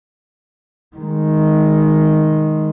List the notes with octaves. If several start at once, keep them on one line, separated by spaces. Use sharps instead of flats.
D#3 G#3